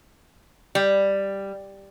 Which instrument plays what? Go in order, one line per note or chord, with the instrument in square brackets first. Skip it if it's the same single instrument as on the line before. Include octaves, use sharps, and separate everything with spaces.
[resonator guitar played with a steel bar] G3